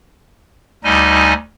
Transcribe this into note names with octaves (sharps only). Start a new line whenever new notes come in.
D2 G3 D#4 D#5 G#5